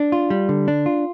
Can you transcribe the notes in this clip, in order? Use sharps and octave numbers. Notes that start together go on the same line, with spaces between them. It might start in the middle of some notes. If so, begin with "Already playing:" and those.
Already playing: D4
F4
G3
D3
D4
F4